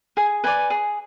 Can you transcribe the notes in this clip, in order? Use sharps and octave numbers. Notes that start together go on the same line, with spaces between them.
G#4 G#5
B4 D5 G#5
G#4